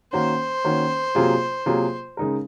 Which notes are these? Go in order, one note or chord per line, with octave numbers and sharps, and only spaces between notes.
D#3 A#3 C#4 F#4 C5
D#3 A#3 C#4 F#4
C3 F#3 A#3 F4 G#4
C3 F#3 A#3 F4 G#4
C#3 G#3 D#4 A#4